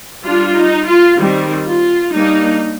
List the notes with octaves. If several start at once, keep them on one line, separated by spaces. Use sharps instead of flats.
G3 D4 F4
D#4
F4
D#3 G3 C4
F4
G3 A#3 D4 D#4